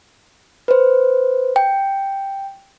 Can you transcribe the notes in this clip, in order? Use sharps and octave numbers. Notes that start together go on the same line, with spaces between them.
B4 C5
G5